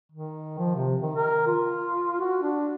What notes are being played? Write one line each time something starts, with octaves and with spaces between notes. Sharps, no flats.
D#3
F3
C3
D#3
A#4
F4
F#4
D4